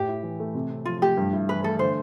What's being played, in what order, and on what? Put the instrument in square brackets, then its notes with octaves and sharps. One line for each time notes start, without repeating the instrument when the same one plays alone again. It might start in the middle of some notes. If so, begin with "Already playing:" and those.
Already playing: [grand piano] A2 [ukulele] G4
[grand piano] E4
E3
A3
C3
C4
[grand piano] F3 [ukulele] F4
[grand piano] A3 [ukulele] G4
[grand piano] G2
E4
[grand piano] E3 [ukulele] B4
[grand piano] A3 [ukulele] A4
[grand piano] D3 [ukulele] C5